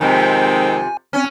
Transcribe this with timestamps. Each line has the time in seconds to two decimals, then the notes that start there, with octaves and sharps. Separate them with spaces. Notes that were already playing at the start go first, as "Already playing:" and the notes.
0.01 F2 C3 D#3 G#3 C4 G#5
1.13 C4 C#4 G#5 F6